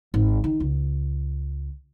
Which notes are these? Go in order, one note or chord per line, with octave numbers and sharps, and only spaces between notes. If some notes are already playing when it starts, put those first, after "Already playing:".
G#1
D#3
C#2